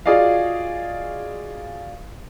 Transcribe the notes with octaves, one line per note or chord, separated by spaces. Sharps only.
F4 F#4 G#4 D5 D#5 F5